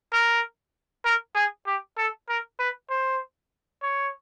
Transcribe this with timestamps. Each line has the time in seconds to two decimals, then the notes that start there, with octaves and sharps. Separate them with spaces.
0.13 A#4
1.05 A#4
1.35 G#4
1.66 G4
1.97 A4
2.29 A#4
2.59 B4
2.90 C5
3.82 C#5